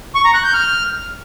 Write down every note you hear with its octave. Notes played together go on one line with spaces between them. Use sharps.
C#6
A#5
F#6
G6
F6